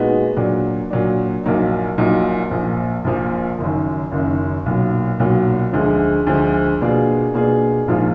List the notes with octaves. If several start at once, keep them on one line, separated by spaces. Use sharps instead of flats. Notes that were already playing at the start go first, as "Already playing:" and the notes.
Already playing: A#2 G#3 B3 D#4 F#4
A#2 F#3 D4
A#2 F#3 D4
A#1 A#2 F#3 A#3 D#4
A#1 A#2 F#3 A#3 D#4
A#1 A#2 F3
A#1 A#2 F3
F#1 F#2 D#3
F#1 F#2 D#3
B1 A#2 F#3
B1 A#2 F#3
D2 D3 F3 G#3
D2 D3 F3 G#3
B2 A#3 D4 F4 G#4
B2 A#3 D4 F4 G#4
A#1 G#2 F3 A#3 F4